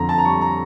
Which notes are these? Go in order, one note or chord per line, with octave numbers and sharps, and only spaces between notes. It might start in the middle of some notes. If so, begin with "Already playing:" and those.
Already playing: F2 D3 A#5
A5
A#5
G3 C#6
A#5